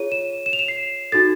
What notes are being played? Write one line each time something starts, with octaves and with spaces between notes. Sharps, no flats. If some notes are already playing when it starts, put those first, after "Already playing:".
Already playing: F4 G#4 C#5 D#7
E7
E7
F7
E7
C7
D#4 F#4 A4 A6